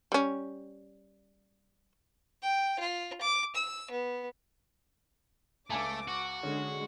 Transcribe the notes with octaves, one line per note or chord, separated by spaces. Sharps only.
G3 C#4
G5
F4
D6
E6
B3
C#2 A3 G#5 A5 D6
F#4
D3 G#3 C#4